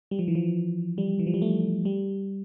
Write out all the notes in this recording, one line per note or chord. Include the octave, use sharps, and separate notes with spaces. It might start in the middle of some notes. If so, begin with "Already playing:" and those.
G3
F3
E3
F3
G3
E3
F3
G3
A3
G3